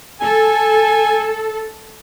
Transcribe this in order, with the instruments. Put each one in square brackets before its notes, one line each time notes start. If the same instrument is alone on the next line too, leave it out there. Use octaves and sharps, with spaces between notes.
[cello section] A4 [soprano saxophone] G#5